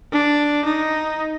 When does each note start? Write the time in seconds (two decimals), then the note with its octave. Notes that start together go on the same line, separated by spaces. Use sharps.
0.13 D4
0.64 D#4